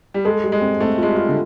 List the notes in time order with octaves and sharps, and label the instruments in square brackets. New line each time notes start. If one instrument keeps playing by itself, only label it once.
[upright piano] G3
[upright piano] G#3 [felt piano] A4
[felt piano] G3
[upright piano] G#3
[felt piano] C4
[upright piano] A3 [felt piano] C4
[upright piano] G#3 [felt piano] F4
[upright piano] G3
[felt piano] F4
[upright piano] D3